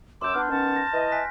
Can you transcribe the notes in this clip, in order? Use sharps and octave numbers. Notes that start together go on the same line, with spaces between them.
F#2 C6 D6 E6 G6
B3 D4 F6
D#3 B3 C#4 A5
A#6
E3 D#5
G#5 F#6 B6